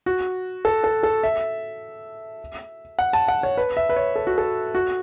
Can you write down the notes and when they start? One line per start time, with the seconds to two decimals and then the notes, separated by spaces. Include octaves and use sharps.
0.06 F#4
0.65 A4
0.84 A4
1.03 A4
1.23 E5
2.99 F#5
3.13 A5
3.28 F#5
3.43 C#5
3.57 B4
3.77 E5
3.89 B4
3.96 C#5
4.16 A4
4.27 F#4
4.38 A4
4.75 F#4